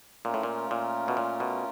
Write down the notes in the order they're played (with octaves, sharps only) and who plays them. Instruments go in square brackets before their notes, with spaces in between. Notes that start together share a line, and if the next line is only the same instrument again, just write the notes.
[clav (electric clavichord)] A#2 [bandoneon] A3 C#4 F4 A#4
[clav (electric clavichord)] A2
A#2
A#2
B2
A#2
B2